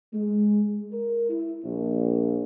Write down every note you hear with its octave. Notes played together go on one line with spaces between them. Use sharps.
G#3
A#4
E4
A#1